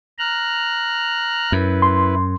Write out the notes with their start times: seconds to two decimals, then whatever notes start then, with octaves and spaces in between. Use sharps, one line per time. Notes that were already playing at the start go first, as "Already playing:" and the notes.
0.18 A#5 F6 F#6
1.52 F#2 E4 B4
1.82 C6